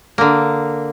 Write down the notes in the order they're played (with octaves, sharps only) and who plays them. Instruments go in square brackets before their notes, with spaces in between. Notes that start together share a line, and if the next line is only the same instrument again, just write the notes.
[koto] D3 A#3